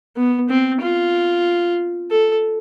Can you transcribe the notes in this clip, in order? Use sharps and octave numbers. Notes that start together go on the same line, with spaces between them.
B3
C4
F4
A4